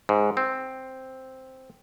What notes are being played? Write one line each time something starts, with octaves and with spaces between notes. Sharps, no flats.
G#2
C4